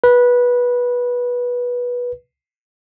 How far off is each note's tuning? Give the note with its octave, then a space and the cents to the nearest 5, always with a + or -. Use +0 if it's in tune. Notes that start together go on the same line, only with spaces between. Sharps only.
B4 -15